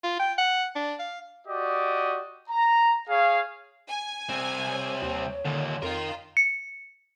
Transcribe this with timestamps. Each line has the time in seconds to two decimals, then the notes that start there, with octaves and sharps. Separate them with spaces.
0.04 F4
0.19 G5
0.38 F#5
0.75 D4
0.99 F5
1.47 F#4 G4 D5 D#5
2.50 A#5
3.09 G#4 C#5 F5
3.89 G#5
4.29 C2 C4
4.67 C#5
5.02 D#2
5.45 D#2 A#2 D3
5.83 F2 D#4 F4 A#4
6.37 C#7